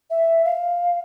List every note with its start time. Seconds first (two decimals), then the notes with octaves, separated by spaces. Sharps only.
0.10 E5
0.45 F5